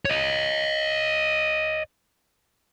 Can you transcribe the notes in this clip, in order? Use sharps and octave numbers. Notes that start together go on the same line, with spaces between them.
C#5 D#5